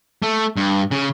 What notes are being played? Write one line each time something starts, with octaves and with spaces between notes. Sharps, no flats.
A3
G2
C#3